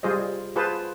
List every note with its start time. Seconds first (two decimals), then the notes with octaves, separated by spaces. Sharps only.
0.03 G3 F4 G#4 C5 D#5
0.56 F4 G#4 B4 C5 A5